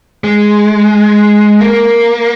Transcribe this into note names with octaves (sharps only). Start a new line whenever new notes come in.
G#3
A#3